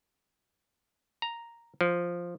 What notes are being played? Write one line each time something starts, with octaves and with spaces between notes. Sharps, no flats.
A#5
F3